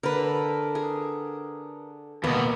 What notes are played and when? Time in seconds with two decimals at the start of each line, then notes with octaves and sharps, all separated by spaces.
0.03 D3 A#4 B4
0.75 G#4
2.24 D#2 B2 A#3 B3